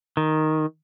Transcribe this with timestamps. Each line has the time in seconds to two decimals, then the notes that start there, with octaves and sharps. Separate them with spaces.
0.17 D#3